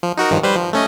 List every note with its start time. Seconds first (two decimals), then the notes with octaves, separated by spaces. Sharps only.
0.03 F3
0.17 D#4 F#4 A#4
0.31 G2 D#3 F3
0.43 G3 B4 C5
0.56 F3
0.73 A3 C#4 D#5